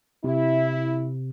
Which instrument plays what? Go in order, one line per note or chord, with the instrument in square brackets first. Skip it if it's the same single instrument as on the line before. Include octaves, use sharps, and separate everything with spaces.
[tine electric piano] C3 [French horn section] E4